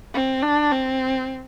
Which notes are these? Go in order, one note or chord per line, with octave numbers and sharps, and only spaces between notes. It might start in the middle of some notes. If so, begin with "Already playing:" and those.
C4
D4
C4